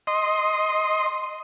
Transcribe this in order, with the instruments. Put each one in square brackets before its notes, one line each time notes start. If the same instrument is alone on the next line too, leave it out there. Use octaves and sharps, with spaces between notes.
[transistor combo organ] D#5 C6